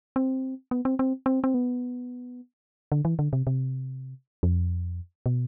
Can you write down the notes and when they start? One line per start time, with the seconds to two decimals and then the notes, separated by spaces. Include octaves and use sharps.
0.16 C4
0.71 B3
0.85 C4
0.99 C4
1.26 C4
1.44 C4
1.54 B3
2.92 D3
3.05 E3
3.19 D3
3.33 C3
3.47 C3
4.43 F2
5.26 B2